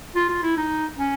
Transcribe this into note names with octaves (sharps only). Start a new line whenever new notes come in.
F4
F4
E4
D#4
C#4